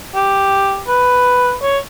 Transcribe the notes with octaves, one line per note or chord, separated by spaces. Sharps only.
G4
B4
C#5